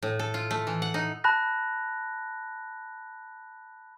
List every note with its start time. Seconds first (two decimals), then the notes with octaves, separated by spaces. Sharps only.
0.02 A2
0.19 A4
0.34 F4
0.51 A3
0.67 E3
0.82 F#5
0.94 D#4
1.24 A5 B5 F#6 A#6